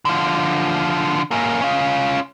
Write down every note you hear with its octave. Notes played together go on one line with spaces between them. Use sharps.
D3 F3
A#3 C#4
C#4 F4